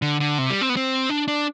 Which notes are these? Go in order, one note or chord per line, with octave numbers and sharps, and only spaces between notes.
D3
D3
C3
G3
C4
B3
C4
D4
D4